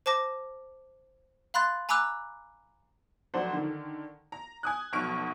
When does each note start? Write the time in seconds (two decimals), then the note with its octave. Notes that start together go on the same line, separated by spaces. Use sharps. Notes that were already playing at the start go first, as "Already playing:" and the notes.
0.06 C5 A5 D6 A#6
1.54 F5 B5 C6 F#6 A6
1.89 G#5 A#5 B5 D6 E6 F#6
3.34 F1 F#3 D4 C5 F#5
3.53 D3 D#3
4.32 A#5
4.63 G#5 D#6 F#6
4.93 F1 B1 B2 C#6 F6 D7